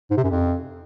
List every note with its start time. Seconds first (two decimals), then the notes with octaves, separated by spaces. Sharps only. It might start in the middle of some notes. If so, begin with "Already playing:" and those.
0.11 G#2
0.17 C3
0.24 F#2
0.30 F2